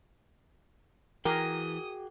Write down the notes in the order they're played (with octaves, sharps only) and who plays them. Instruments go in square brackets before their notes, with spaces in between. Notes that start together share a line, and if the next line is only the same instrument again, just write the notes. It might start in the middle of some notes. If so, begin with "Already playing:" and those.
[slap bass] E3 [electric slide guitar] F#4 G#4 G5 [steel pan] A#4 [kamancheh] D#6